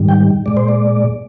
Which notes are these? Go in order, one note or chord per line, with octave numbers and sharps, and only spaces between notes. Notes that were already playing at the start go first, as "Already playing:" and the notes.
Already playing: G#2 D#3 G3
G5
A#2 G#3 D5
C5
D5